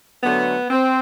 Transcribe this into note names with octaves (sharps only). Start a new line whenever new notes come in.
D3 F#3 A3 B3
C4